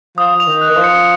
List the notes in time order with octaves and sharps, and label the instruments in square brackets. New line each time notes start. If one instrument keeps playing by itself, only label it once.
[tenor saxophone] F3 [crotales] D#6
[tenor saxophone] F3 [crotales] F7
[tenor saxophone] D#3
[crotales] F#6
[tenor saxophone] D#3
F3
[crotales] C#7